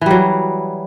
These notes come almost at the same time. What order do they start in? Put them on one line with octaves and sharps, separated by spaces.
E3 G3 F#3